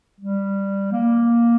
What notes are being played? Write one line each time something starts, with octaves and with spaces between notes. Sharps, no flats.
G3
A#3